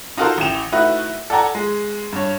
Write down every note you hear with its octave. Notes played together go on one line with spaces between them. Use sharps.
D#4 F4 F#4 A4 A#4 C5
A1 E3 G5 E7 F7
A3 D#4 E4 F#4 B4
A4 D5 F#5 G#5 A#5
G#3
G2 C#5